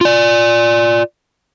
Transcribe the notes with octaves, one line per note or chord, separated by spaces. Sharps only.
F4 D5